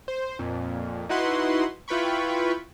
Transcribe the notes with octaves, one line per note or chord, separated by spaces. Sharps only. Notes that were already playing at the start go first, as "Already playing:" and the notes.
C5
F2 A#2
D#4 E4 F#4 B4 F#5 C6
E4 F4 B4 G5 B5 C#6